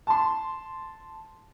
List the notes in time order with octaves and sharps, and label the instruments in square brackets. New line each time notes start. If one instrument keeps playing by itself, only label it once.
[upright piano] A5 C6